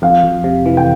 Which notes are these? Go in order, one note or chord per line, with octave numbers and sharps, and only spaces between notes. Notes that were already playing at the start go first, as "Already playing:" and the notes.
F2 F5
F2
C3
E3
G5